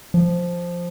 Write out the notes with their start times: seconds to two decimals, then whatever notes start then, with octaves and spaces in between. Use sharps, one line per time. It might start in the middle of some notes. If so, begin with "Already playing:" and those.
0.14 F3